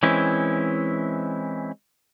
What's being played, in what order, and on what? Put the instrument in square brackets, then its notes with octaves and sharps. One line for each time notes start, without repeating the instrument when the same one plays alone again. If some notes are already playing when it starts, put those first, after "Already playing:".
[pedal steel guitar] E3 G#3 C4 C#4 E4